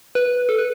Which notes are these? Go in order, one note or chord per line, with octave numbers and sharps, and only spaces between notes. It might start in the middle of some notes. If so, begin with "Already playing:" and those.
B4
A4
B4